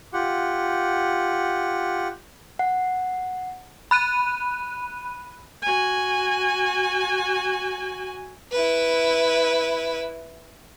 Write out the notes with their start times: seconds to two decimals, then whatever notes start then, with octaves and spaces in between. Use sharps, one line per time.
0.13 F4 G4 F#5
2.59 F#5
3.91 B5 F#6 D#7
5.62 F#4 G#5
8.52 E4 B4